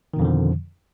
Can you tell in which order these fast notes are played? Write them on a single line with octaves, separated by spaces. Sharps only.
D#3 B2 F2 D3 F3